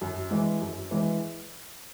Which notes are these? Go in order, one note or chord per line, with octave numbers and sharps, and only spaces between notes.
F#2
E3 G#3
F#2
E3 G#3